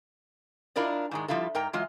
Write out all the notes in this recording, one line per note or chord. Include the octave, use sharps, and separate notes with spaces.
D4 E4 F4 A#4 D5 D#5
G#2 D#3 G#3
F3 G3 E4 F4 A4
G#2 A#4 G5 A#5
E3 F#3 G#3 F4